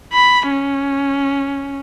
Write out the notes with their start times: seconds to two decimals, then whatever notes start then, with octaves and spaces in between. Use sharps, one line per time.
0.13 B5
0.50 C#4